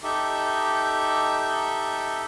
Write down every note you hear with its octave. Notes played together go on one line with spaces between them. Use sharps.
D#4 G4 A4 E5